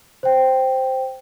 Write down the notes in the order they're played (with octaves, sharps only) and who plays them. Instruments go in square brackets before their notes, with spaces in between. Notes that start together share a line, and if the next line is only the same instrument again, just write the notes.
[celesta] C5 G5